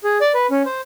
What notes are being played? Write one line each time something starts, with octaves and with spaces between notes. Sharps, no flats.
G#4
D5
B4
C#4
C5